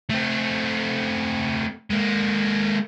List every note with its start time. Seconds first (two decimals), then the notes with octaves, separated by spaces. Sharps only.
0.10 A3 C4
1.90 G#3 A#3